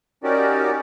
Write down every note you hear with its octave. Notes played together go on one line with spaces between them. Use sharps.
C#4 D#4 F#4 G4 A#4 D5